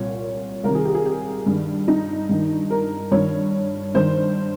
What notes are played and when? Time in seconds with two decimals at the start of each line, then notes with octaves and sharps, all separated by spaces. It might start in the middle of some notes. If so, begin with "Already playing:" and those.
Already playing: C2 A#2 C#5
0.64 C2 C3 D#3 A#4
0.75 G#4
0.85 G4
0.95 G#4
1.06 G4
1.46 G2 D#3
1.88 D#4
2.29 G2 D#3
2.70 A#4
3.11 G2 D#3 C#5
3.94 G2 D#3 C5